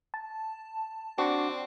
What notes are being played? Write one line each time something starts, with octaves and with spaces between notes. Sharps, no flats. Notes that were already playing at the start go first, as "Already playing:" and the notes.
A5
C4 D4 F#4